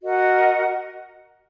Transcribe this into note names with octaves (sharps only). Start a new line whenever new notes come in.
F#4 A#4 D#5 F#5